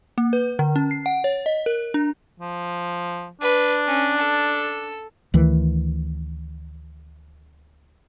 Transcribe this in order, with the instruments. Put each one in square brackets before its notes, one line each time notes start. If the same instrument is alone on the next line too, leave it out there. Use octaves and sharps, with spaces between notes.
[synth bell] A#3
B4
D3
C#4
C7
F#5
C#5
D#5
A#4
D4
[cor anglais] F3
[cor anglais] D4 [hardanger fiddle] B4
[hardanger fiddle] C#4
A4
[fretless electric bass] D2 D#3 E3